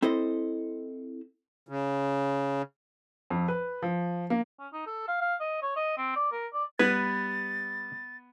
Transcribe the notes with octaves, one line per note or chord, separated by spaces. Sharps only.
C4 E4 A4 C5 D#5
C#3
F2
B4
F3
A#3
C#4
D#4
A4
F5
F5
D#5
C#5
D#5
C4
D5
A#4
D5
G3 B3 B4 G#6 A6